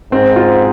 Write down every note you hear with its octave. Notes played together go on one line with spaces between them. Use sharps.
G#2 C4
F4